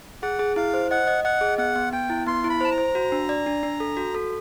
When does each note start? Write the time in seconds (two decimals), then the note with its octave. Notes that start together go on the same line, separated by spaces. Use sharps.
0.22 G#4 F#5
0.39 G#4
0.56 E4 F5
0.74 C5
0.91 D#5 F#5
1.08 D#5
1.24 D#5 F#5
1.41 G#4
1.58 B3 F#5
1.76 B3
1.93 B3 G5
2.10 E4
2.27 B3 C6
2.44 E4
2.49 B5
2.61 C5 A5
2.72 A#5
2.78 C5
2.95 F#4
3.12 D4
3.29 D5
3.46 D4
3.63 D4
3.80 A4
3.97 F#4
4.15 A4